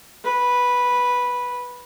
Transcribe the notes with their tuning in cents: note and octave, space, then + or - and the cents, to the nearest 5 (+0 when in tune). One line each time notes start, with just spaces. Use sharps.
B4 -5